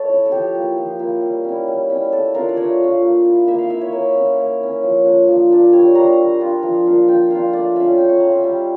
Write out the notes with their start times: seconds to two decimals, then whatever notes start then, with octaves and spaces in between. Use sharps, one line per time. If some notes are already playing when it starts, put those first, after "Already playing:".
Already playing: A3 A4 C#5
0.09 E4
0.26 A4
0.32 F3 G4
0.55 A#3 E4
0.77 F3
0.99 A#3 E4
1.22 G3
1.44 C#4 E4
1.68 G3
1.89 C#4 E4
2.12 A3 A4
2.34 D4 F4 A#4
2.49 D5
2.57 A3 C#5
2.80 D4 F4
3.02 A#3
3.25 E4
3.47 A#3 E5
3.58 F5
3.70 E4 E5
3.81 C#5
3.92 A#3 A#4
4.15 C#4 E4
4.38 A#3
4.60 C#4 E4
4.83 F3
5.05 A#3 D4
5.28 F3
5.50 A#3 D4
5.73 G3 C#5
5.95 D4 F4 A#5
6.18 G3
6.40 D4 F4
6.63 F3
6.86 A#3 D4 F4
7.08 F3 G5
7.30 A#3 D4 F4 F5
7.53 A3 D5
7.76 C#4 F4 E5
7.97 A3 G5
8.09 C#6
8.20 C#4 F4 A#5
8.32 E5
8.44 G3